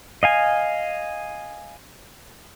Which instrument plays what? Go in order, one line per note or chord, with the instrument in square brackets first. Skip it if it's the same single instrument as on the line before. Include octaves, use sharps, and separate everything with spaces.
[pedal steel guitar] D#5 F5 G#5